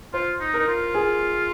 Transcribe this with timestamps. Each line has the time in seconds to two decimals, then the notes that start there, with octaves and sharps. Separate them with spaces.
0.13 F4 C5
0.41 D#4
0.54 A#4
0.59 D#4
0.68 F4
0.94 G#4